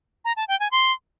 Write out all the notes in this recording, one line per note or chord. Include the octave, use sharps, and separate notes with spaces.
A#5
A5
G5
G#5
C6